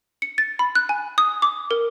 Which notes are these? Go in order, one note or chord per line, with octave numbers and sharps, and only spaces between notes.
C#7
A6
B5
F#6
G#5
D#6
D6
A#4